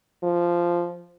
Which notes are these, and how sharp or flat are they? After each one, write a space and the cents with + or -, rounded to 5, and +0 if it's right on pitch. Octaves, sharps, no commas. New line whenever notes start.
F3 -10